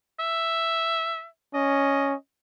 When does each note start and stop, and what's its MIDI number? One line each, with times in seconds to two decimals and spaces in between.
0.19 1.27 76
1.54 2.14 61
1.54 2.13 75